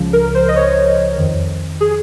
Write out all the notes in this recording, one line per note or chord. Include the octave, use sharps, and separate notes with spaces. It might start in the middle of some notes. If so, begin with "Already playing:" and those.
Already playing: C#2 C#3 F3
A#4
C5
D#5
C#5
F2 D#3
G#4